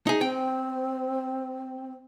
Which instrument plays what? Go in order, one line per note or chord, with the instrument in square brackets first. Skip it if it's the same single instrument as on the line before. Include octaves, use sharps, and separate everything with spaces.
[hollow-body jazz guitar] D#4 G#4
[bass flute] C4 [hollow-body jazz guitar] G5